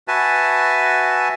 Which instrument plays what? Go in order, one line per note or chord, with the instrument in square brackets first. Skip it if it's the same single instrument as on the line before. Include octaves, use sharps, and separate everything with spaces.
[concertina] F#4 B4 E5 G#5 A5